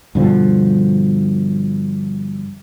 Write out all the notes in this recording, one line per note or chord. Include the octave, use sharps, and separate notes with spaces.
G2 B2 D3 F3